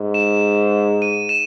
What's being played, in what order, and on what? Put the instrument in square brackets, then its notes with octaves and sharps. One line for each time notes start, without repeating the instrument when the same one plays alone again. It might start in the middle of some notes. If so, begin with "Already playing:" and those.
Already playing: [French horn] G#2
[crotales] E7
D#7
E7